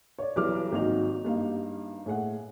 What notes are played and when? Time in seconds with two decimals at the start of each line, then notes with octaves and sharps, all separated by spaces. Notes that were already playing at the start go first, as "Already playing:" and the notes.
0.19 C#5 D5
0.36 B1 E3 F#3 G3 D6 F6
0.72 G#1 F#3 A#3 D#4 F#4 F7
1.25 G2 A#3 D#4
2.06 A2 G#4 F#5